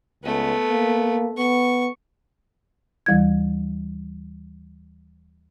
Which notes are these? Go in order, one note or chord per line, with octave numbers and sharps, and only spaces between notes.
C#2 A3 B3
A#3
B3 C#6
D#2 E3 G3 E4 G#6